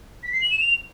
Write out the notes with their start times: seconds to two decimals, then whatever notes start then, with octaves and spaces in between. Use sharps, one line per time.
0.23 B6
0.32 C7
0.41 F#7
0.50 E7
0.60 F7